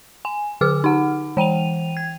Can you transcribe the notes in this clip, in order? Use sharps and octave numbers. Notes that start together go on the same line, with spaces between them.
G#5
D3 G#4 D6 F6
D#4 F#5
E3 G5 D#7 F7
G#6